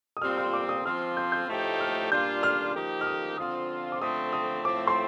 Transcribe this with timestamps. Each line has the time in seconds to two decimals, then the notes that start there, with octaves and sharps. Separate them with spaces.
0.17 D#6
0.21 A#2 G3 C4 F4 F6
0.37 F6
0.53 D6
0.69 D#6
0.85 F3 C4 F4 F6
1.17 G6
1.32 G6
1.48 A2 F3 A3 D#4 G4
1.80 F6
2.11 A#2 G3 D4 F4 G6
2.43 F6
2.75 F3 A#3 D#4 G4
3.01 F6
3.06 D#6
3.37 D3 F3 C4 F4 D#6
3.92 D6
4.01 D3 F3 A3 C4 D#6
4.33 D#6
4.65 A2 F3 A3 C4 D6
4.87 C6